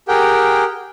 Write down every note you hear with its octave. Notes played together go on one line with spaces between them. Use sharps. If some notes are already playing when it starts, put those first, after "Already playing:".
G4 G#4 A#4 F#5 G5